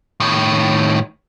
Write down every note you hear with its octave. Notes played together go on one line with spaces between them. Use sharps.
A2 D#3